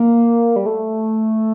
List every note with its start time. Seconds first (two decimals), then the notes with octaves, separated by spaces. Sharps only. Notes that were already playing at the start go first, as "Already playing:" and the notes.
Already playing: A#3
0.56 G3
0.66 A3